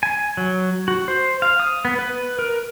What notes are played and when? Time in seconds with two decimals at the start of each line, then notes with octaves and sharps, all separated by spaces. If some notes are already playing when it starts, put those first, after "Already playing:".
0.03 G#5
0.37 F#3
0.88 F#4
1.08 C5
1.42 F5
1.60 D#6
1.85 B3
1.99 B4
2.39 A#4